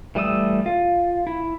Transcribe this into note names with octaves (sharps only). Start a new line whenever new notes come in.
E3 G3 A3 D#6 E6
F4
E4